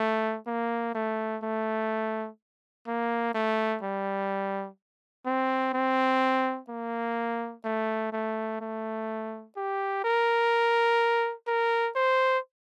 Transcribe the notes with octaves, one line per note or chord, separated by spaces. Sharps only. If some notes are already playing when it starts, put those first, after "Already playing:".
Already playing: A3
A#3
A3
A3
A#3
A3
G3
C4
C4
A#3
A3
A3
A3
G4
A#4
A#4
C5